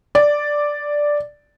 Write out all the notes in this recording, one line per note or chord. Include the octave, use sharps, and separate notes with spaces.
D5